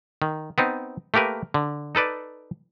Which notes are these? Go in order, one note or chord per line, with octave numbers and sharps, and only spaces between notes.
D#3
B3 C4 D#4
A3 A#3 G4 A#4 B4
D3
D#4 A4 B4 D5